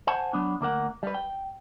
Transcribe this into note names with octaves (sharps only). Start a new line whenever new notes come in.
C5 F#5 G#5 A5
F#3 B3 D4
D2 A#3 A#4 F#5
G3 B4
G5